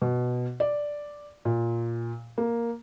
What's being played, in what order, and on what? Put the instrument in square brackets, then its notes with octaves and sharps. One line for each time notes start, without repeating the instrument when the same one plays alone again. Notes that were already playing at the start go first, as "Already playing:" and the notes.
[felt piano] B2
D5
A#2
A#3